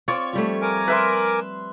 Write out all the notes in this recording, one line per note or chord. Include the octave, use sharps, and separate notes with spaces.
C4 F4 C#5 D5
F3 G3 A3
A#4 G#5 D6
B4 E5 C6